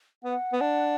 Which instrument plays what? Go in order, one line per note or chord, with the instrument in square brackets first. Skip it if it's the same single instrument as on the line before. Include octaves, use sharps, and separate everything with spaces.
[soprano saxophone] B3 [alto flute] F#5
[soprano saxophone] B3
D4